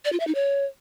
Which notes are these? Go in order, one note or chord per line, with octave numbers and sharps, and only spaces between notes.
D5
F4
E5
D#4
C#5